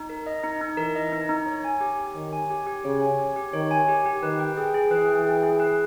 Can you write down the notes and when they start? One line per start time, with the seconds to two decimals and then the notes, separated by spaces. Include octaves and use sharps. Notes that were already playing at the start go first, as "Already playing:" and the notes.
Already playing: D#4
0.09 A#4
0.27 D#5
0.44 D#4
0.61 D#4
0.77 E3 A#4
0.95 D#5
1.12 D#4
1.29 D#4
1.46 C#5
1.64 G#5
1.81 G4
1.99 G4
2.15 D#3 C#5
2.33 G#5
2.50 G4
2.67 G4
2.84 C#3 C#5
3.01 G#5
3.19 G4
3.36 G4
3.53 D#3 C#5
3.71 G#5
3.88 G4
4.06 G4
4.23 D#3 B4
4.39 G5
4.57 G#4
4.74 G#4
4.91 E3 B4
5.08 G5
5.25 G#4
5.43 G#4
5.60 B4